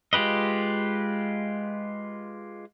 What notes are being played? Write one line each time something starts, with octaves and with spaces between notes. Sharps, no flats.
G#3 F4 G4 B4 D#5